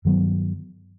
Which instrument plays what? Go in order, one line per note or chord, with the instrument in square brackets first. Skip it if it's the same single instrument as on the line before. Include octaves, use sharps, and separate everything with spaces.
[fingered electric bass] G2 D#3 F#3 B3